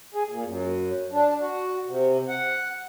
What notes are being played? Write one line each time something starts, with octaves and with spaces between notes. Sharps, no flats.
G#4
A#2
F#2
D4
F#4
C3
F#5